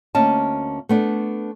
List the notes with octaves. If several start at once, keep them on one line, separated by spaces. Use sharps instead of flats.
D2 A#3 C#4 D#5 A5
A3 B3 D4